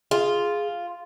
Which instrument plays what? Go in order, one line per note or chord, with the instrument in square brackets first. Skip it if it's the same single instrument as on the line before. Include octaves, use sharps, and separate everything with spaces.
[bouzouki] F4 [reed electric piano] G#4